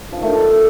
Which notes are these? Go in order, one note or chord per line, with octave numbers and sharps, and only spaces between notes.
F3
D#3
A3
D3